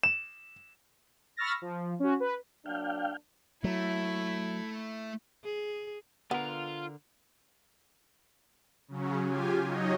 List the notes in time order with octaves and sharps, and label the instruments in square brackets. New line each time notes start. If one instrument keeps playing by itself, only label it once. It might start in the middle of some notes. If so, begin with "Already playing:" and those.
[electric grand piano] E7
[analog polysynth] B5 C#6 E6 F6 A6 A#6
F3
C#4 F#4
B4
[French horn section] F#3 A#3 D4 [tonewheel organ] F5 G5
[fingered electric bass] F#3 [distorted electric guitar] A3 [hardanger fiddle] E4
[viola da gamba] G#4
[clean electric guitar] D3 A#4 [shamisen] B3 [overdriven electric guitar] F4
[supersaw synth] C#3 F#3 C#4
F4 G4 G#5
F#3 D#4 C#5 D#5